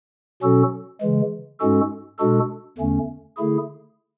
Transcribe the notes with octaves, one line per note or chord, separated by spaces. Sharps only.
B2 F#3 C#4 F#4 A4
C#3 E3 G#3
G#2 G#3 C#4 F#4 A4
B2 G#3 D4 F#4 A4
E2 D3 A3 C#4
D3 A3 E4 G#4